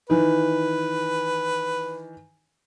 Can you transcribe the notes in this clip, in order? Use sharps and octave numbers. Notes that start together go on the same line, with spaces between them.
D#3 E3 B4